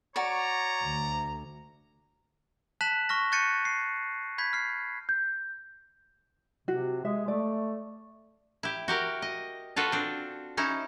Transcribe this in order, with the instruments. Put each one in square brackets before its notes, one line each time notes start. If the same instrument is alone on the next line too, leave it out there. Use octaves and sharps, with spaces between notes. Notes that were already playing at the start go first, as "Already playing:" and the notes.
[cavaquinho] F#4 D5 [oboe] C#5 [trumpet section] A#5
[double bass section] D2
[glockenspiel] A5 F#6 B6 E7 F#7
C#6 F6 A#6
C#6 F#6 G6 A6 C#7 D#7
C7
B5 G6 G#6 B6
F6 C7
[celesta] G6
[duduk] C3 [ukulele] F#4
[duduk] G#3 [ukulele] E5
[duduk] A3 [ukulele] D5
[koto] E4 G4
F#4 G4 A#4
D#5
F4 F#4 A4 B4
C4 D4
C#4 D#4 E4